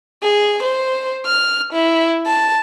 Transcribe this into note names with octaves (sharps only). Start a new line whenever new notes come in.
G#4
C5
F6
E4
A5